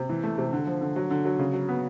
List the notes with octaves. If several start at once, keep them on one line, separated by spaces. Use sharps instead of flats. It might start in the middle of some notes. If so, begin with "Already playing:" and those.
Already playing: C3
E3
A3
C3
D3
F3
D3
F#3
D3
F#3
C#3
F#3
B3